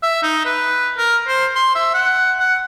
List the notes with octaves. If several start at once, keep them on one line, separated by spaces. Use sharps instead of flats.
E5
D#4
B4
A#4
C5
C6
E5
F#5
F#5